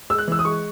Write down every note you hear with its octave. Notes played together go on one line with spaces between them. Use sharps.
G#3 E6
F#6
E3 E6
D#6
G#3 C#6